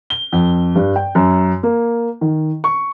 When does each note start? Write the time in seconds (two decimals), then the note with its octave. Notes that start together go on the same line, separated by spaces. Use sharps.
0.10 G7
0.32 F2
0.76 G2
0.96 G5
1.15 F#2
1.63 A#3
2.21 D#3
2.64 C#6